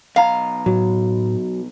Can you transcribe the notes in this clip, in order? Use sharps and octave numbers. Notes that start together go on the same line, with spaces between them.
B1 F5 A#5
A2 F#3